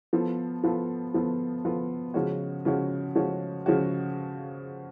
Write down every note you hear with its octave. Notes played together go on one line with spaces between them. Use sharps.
F3 B3 F4 A4
F3 B3 F4 A4
F3 B3 F4 A4
F3 B3 F4 A4
C#3 F3 G#3 C#4 F#4
C#3 F3 G#3 C#4 F#4
C#3 F3 G#3 C#4 F#4
C#3 F3 G#3 C#4 F#4